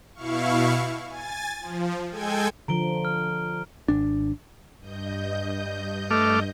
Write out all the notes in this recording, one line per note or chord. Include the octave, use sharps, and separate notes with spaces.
B2 E4 F5 C#6
G#5 A6
F3
G#3 A4 G5 G#5 G#6
D3 F3 A#5 D7 G7
F6
G#1 D4
G2 D#5 G6
A3 D6 F6